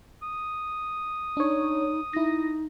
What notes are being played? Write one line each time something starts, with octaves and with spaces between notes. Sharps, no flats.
D#6
D4 D#4 C#5
D#4 E4 A#6